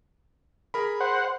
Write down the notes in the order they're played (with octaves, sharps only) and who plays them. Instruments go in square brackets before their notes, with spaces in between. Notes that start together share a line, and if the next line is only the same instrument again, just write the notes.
[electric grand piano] G#4 A#4 B5
[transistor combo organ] C5 F#5